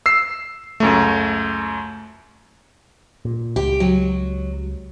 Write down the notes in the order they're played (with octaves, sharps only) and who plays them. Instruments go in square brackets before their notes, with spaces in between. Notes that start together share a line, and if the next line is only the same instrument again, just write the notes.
[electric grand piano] E6 C7
C#2 F#2 A3
[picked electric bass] A#2
[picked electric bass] C#2 [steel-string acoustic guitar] G4
[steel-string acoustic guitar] F#3